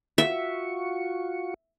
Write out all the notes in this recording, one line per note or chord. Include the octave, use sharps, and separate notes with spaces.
F4 F#4 E5 C#6